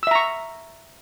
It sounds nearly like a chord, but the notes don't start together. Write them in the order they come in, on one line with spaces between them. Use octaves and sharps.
E6 E5 A#5 C#6